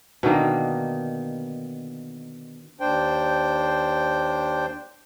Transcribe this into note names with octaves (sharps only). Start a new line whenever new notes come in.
B2 D3 D#3 A#3
D#2 D4 C5 G5